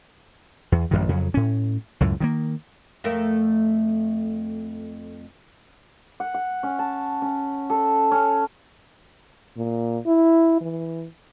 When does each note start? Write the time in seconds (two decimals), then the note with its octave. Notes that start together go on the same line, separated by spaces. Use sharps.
0.72 E2
0.91 A1 F#2 D#3
1.09 F2 C#3 F#3
1.34 A2 C#4
2.00 C#2 F#2 A2
2.20 D#3 F#3 A#3
3.04 F2 A3 A#4
6.20 F#5
6.34 F#5
6.63 C#4
6.79 A5
7.22 C#4
7.70 A4
8.11 C#4
9.57 A#2
10.06 E4
10.61 E3